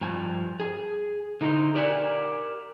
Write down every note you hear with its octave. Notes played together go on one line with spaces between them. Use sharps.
G2 F3 G#5
G#4 G#5
D3 D#4 E4 A4 C5
G4 A#4 D5 E5 F#5 G#5